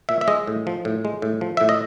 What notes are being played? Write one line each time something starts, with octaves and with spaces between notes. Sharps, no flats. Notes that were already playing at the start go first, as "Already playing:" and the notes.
A#2 E5
E5
G#3 D#5
A2
F3
A2
G#3
A2
F3
A2 E5
D#5